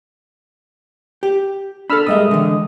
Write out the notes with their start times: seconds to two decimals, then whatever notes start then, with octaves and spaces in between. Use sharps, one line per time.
1.23 G4
1.90 D4 A4 B5 E6 F6
2.07 A#2 G3 G#3 D#5 E5 D#6
2.31 D3 E3